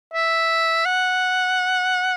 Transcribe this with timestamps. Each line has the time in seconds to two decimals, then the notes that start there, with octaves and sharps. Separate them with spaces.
0.14 E5
0.85 F#5